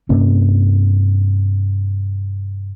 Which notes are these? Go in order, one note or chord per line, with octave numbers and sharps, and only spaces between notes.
G2 C3 A#3 C#4